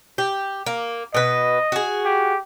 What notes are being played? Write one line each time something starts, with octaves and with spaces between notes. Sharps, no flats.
G4
A#3
B2 B4 D#5
F#4 G#4
G4